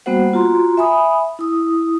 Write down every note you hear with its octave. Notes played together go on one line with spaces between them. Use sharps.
G3 A#3 B3 F#4 C5 F#5
F4 F#4 A#5 C6
E5 G#5 B5 D#6
E4 D#6